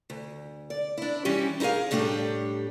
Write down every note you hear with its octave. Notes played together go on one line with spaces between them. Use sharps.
D2
D5
D4 E4
E3 G3 C#4 G4
D#4 E4 G#4 A#4 F5
A2 G3 A3 D4 G4